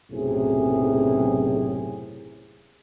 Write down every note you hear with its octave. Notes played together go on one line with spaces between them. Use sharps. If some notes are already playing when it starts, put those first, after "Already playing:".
B1 F#2 A2 C3 G#4